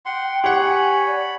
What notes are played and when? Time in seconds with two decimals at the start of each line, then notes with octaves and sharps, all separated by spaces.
0.06 F#5 G5 C6
0.44 G4 C#5 F#5 B5
0.59 G#5
1.07 D5